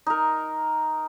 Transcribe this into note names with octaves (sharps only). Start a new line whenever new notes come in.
D#4 A#4